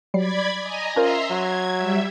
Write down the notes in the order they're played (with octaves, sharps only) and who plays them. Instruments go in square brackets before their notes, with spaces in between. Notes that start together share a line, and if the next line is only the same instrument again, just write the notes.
[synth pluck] F#3 G3 C7 [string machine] D5 B5 G#6
[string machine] D#5 G#5 A#5
[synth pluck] C#4 A#4 C5 [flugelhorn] F4 [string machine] E5 A#5 C6
[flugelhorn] F#3 [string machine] G#6
[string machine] G3 E5